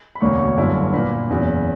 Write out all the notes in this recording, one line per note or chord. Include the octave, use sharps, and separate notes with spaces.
B5
E1 D2 D3 A#3 C#5 C#6
C#5 C#6
G1 F#2 D3 A#3 E4
A#2 A#3 D4 B4 B5
F#1 E2 C#3 F#3